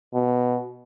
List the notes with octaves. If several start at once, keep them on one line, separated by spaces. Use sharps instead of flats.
B2